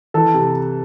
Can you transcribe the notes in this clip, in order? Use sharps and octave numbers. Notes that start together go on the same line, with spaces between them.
E3 A4 A5
C3